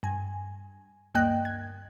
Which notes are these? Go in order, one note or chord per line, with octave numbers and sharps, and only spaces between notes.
G2 G#5
D2 G2 A#3 D#5 G5 F#6
G#6